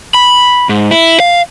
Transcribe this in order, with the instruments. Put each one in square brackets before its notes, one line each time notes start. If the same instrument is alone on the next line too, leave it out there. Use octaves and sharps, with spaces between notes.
[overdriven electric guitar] B5
G#2
E4
F5